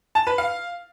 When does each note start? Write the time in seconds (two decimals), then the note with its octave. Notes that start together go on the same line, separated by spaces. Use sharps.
0.15 A5
0.27 B4
0.38 F5